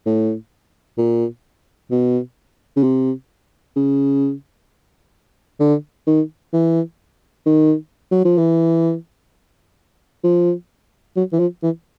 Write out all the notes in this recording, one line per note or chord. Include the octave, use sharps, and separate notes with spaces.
A2
A#2
B2
C#3
C3
C#3
D3
D#3
E3
D#3
F#3
F3
E3
F3
F#3
E3
F3
E3